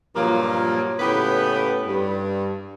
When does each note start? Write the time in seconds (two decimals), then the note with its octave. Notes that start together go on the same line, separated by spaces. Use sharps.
0.15 G2 A#2 F3 F#3 A#3
1.00 A2 C#3 B3 G4 B4 B5
1.88 G2